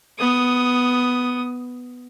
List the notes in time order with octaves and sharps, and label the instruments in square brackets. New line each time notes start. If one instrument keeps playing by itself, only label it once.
[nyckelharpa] B3 D#6